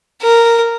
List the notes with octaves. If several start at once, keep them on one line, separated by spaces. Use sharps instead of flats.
A#4